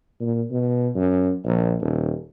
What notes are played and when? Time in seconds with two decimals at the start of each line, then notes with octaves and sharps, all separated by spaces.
0.21 A#2
0.51 B2
0.95 F#2
1.44 A#1
1.81 D#1